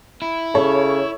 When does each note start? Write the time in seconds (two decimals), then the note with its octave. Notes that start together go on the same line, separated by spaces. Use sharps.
0.22 E4
0.55 C#3 A4 C#5